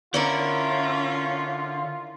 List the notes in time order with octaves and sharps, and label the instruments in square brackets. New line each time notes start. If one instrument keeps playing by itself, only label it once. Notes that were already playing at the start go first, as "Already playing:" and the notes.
[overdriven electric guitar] D3 [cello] C#4 [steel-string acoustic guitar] D4 E4 A#4 [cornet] F4